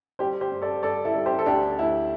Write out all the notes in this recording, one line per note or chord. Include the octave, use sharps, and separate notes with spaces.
G3 G4 C5
G4 C5
G2
A4 D5
G2 A4 D5
E4 A4
G3
G4 C5
A4
D2 D4 G4
D2 E4